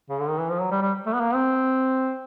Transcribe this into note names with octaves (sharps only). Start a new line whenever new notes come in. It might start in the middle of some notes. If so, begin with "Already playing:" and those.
C#3
D3
D#3
E3
F3
F#3
G3
G3
A3
B3
A#3
C4